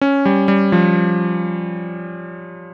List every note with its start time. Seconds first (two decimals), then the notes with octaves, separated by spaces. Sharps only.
0.01 C#4
0.25 G3
0.48 G3
0.72 F3